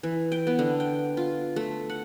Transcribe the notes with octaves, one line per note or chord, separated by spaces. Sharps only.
E3
G5
B3
D3
G5
F4
A3
F#5